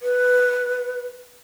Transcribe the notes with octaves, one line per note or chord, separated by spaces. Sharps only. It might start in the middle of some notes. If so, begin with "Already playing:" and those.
B4